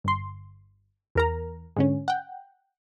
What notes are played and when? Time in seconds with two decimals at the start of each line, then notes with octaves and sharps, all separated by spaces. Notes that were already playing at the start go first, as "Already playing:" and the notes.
0.04 G1 C6
1.15 E2 A#4 A#5
1.76 G#2 D3 C#4
2.08 F#5 G5